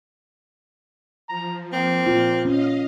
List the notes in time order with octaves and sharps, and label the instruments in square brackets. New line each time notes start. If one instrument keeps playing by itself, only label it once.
[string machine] F3 [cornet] A#5
[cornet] A#3 [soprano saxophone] C4
[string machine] A#2 [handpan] F4
[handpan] C#4 [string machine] D#5 F5